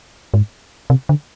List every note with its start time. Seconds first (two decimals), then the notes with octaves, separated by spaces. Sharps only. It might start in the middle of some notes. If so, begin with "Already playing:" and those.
0.34 G#2
0.90 C3
1.09 D3